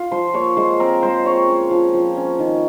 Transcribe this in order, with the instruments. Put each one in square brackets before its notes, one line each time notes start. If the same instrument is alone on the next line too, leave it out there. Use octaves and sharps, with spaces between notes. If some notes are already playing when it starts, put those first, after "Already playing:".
Already playing: [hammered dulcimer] F4 F5
F3 C5 C6
A#3 C#5 C#6
G#3 C5 C6
C4 A#4 A#5
G#3 C5 C6
C4 C#5 C#6
C#4
F3
F3
C#4
D#3